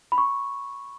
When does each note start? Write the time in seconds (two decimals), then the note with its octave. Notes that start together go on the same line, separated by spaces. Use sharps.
0.12 B5
0.18 C#6